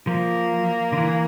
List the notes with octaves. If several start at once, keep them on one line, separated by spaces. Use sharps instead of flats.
F3 A#3
D3
E3